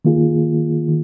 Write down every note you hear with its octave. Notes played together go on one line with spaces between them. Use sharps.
D#3 A#3 F4 G#4
D#3